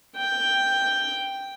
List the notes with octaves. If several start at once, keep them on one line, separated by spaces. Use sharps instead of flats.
G5